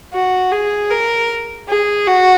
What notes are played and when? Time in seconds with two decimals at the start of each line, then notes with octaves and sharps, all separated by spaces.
0.14 F#4
0.52 G#4
0.91 A#4
1.69 G#4
2.08 F#4